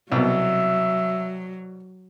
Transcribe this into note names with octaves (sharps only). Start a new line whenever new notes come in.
C2 B2 F#3 E5